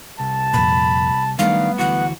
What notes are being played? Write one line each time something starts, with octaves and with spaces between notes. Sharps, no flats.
C2 A5
F2 A#2 B5
D#3 F#3 G3 A3 B3 D4 F5
D2 E3 F#4 F#5